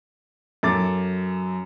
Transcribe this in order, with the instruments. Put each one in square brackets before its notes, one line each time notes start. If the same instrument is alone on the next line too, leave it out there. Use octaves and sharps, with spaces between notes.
[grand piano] F#2 A4 D6 A6